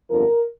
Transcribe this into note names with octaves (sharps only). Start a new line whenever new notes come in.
G1 F2 D3 F3 A#4